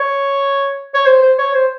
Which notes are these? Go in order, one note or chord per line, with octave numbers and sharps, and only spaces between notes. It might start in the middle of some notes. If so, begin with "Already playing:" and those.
Already playing: C#5
C#5
C5
C5
C#5
C5